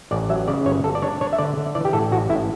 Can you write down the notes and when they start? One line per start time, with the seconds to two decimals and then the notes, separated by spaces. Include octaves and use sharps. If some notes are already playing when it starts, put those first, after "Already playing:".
0.11 A1 D5
0.29 F#3 E5
0.48 C#3 D5
0.65 G1 C#5
0.84 G1 A4
0.95 D5
1.02 D4 C#5
1.21 D4 C#5
1.33 E5
1.38 D3 D5
1.57 D3
1.75 E3 D5
1.85 G4
1.93 A2 A4
2.11 A1 F#4
2.29 A2 E4